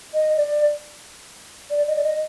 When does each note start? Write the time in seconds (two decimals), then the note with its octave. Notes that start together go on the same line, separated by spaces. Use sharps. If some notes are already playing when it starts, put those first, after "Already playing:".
0.14 D#5
0.37 D5
1.71 D5
1.87 D#5
1.96 D5
2.04 D#5